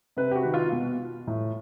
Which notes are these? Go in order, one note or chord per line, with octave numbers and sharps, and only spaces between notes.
C3 B4
G4
F#4
D#3
F4
B2
A2